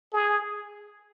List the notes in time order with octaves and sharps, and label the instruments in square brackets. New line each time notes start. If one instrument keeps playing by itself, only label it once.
[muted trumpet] G#4